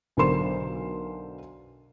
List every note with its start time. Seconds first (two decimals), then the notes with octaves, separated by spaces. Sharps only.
0.17 B1 D3 A#4 C5 C6 E7